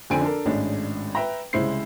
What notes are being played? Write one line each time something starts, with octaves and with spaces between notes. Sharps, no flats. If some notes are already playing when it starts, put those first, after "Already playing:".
F2 D3 C4 G#5 D7
D4 A4 A#4
G#1 A2 G#3 C#4 D4 D#5
B4 E5 G5 A#5
C2 C#3 G#3 E4 C5 C7